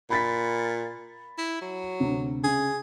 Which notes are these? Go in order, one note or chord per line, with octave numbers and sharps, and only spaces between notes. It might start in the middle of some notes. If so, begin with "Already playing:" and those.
A#2 B5 A6 B6
E4
F#3
D2 C3
C#3 G#4